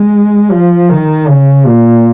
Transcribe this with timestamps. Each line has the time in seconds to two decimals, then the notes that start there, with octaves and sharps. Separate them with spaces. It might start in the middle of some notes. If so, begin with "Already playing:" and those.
Already playing: G#3
0.51 F3
0.89 D#3
1.28 C#3
1.66 A#2